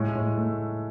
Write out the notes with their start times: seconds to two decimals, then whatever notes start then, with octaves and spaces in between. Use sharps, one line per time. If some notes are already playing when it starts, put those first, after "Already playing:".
Already playing: A2 G#3
0.15 A2
0.37 A3